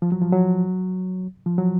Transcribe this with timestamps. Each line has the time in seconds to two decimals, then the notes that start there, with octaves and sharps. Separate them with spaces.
0.02 F3
0.12 F#3
0.22 F3
0.33 F#3
1.46 F3
1.58 F#3